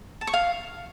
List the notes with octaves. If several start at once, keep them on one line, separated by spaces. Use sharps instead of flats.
A5
C#6
F5